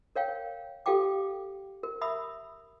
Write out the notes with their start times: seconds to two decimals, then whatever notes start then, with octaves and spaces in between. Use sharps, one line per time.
0.16 A#4 C#5 F5 G5
0.86 G4 A4 F5 G5 D6
1.83 A#4
2.01 E5 B5 D#6 E6